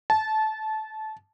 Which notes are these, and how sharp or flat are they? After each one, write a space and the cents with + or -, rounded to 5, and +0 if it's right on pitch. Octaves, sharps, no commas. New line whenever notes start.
A5 -20